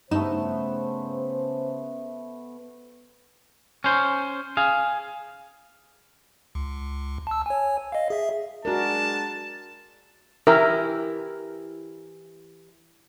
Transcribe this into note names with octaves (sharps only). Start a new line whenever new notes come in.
G2 C#3 A3 B3 D#4 C5 E7
C#4 C5
G#4 F5
C#2
A5 E6
C#5 G#5
D#5 F5
G#4 E5
G#3 D4 F#4 A#4 A5
E3 E4 G4 A#4